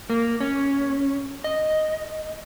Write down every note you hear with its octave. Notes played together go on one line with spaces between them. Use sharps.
A#3
C#4
D#5